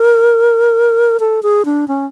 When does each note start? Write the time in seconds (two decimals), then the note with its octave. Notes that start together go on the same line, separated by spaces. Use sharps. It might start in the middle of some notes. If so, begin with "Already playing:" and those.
Already playing: A#4
1.20 A4
1.43 G#4
1.65 D4
1.88 C#4